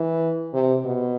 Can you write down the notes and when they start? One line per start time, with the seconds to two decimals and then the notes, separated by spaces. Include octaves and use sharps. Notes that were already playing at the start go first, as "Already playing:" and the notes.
Already playing: E3
0.54 C3
0.86 B2